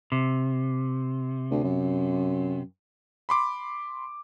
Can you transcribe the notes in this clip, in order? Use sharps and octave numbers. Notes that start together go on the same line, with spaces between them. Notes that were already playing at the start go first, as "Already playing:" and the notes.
C3
D2
F#2
B5 C6 D6